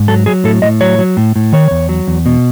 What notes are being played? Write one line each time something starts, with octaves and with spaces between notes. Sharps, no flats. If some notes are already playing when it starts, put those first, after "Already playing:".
Already playing: G#2
F#3 A4
F#3 G#4
A2 A4
A2 D#5
F#3 C#5
F#3
A2
A2
D#3 C#5
E2
F#3
E2
B2